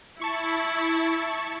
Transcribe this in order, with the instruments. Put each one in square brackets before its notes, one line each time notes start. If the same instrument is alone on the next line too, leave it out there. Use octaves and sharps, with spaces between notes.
[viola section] E4 [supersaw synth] A5 C#6 C#7